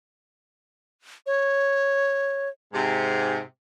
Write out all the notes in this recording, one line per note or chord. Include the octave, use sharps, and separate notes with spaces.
C#5
G#2 C3